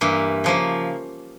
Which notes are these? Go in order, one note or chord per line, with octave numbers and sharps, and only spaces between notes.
G2 E3 A#3
C#3 F3 A#3